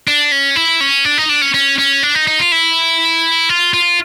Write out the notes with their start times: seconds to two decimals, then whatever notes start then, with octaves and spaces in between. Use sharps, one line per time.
0.08 D4
0.32 C#4
0.56 E4
0.81 C#4
1.05 D4
1.18 D#4
1.29 D4
1.42 C#4
1.54 C#4
1.78 C#4
2.03 D4
2.15 D#4
2.27 D#4
2.39 F4
2.52 E4
3.49 F4
3.74 F4